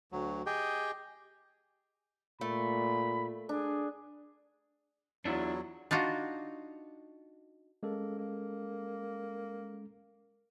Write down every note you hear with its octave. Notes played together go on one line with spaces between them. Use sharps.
D2 F#3
G4 G#4 D#5 G5
A#2 A3 B5
D4 G#4
E2 F#3 D4 E4 F4
D4 D#4 F4 F#4
G#3 A#3 C#4 A4
A#3